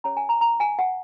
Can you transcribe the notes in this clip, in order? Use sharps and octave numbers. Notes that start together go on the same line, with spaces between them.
C#4 G#4 C#5 A#5
G#5
A#5
A#5
G#5
F#5